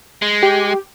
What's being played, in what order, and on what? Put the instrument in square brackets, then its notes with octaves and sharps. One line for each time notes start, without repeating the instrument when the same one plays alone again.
[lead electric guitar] G#3
[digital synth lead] G4